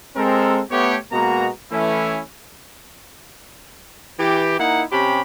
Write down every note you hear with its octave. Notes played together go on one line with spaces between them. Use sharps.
G#3 C4 A4 A#4
A3 B3 G4 C#5
B2 G#3 A#3 B3 F#4 A#5
E3 A3 C#4 E4
E3 G4
A#3 D#4 E4 F#5
C3 C#4 G4 B5